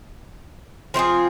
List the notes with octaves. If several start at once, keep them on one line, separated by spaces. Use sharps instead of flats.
F3 C4 F4 G#4